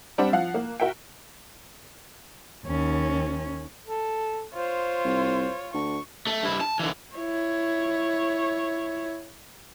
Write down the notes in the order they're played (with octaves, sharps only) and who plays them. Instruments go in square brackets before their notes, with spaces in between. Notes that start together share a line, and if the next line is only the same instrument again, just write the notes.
[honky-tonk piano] G3 C4 D4 F#5
F3 F5 F#5 F#6
A#3
F#4 A#4 E5 G5
[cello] D#2 C#4
[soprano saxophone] A4
[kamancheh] F4 C#5 [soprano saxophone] C5
[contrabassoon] C2
[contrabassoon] D2 [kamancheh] C#6
[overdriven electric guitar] A3
G2 E4
A5
D3 E3
[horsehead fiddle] E4 C#5